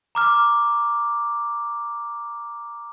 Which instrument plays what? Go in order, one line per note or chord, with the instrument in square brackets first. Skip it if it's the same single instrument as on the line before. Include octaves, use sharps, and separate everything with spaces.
[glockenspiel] A#5 D6 F6